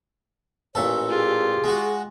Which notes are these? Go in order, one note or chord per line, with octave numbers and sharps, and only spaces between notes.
A1 A#2 A4 C#5
F4 G4 G#4
G#3 F#4